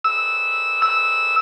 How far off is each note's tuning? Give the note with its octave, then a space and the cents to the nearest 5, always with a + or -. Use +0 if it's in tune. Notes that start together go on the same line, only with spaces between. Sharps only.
E6 -10
E6 -10